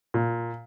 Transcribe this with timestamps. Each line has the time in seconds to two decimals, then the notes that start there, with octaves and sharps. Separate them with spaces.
0.14 A#2